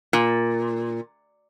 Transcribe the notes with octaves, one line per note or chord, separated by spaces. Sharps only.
A#2